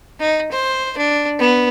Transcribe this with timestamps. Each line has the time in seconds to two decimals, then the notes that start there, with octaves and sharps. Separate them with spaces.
0.20 D#4
0.52 C5
0.97 D4
1.39 B3